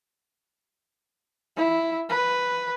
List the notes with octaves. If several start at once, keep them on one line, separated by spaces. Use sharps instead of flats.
E4
B4